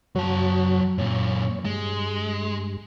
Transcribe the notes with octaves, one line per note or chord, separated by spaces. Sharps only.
F#2 F#3 F#4 C#5 A5
F#2 A#2 C#5
G2 G#3